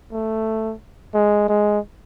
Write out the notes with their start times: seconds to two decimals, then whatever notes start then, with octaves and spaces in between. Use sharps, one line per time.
0.12 A3
1.14 G#3
1.48 G#3